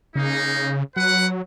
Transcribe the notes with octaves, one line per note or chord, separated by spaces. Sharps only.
C#3 A#3 D#4
F#3 B4 F#5